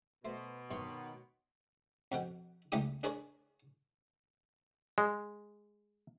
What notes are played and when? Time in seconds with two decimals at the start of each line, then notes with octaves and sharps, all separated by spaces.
0.25 B2 A3 C5
0.71 G2 C3 D#3 B3 C#5 C6 C#6
2.12 F2 B2 F#5 G5
2.72 C#2 E3 G3 A3 G4 D#6
3.03 D4 G#4 A#4 B4 C#5 D5
4.98 G#3